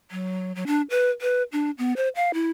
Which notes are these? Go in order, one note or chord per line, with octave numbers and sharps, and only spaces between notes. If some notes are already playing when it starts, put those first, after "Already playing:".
F#3
F#3
D4
B4
B4
D4
B3
C5
F5
E4